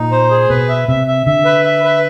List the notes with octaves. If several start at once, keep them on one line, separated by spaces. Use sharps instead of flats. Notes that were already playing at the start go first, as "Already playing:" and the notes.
Already playing: A#2 D#4
C5
G#4
B2 B4
E5
C3 E5
E5
D3 E5
B4
E5
B4